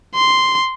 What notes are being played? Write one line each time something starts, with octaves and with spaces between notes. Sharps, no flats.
C6